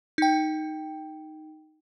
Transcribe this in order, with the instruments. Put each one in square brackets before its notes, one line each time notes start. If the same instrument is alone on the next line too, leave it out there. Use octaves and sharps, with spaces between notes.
[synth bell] D#4 G5